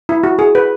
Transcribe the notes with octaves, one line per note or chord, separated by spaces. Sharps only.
E4
F#4
G#4
B4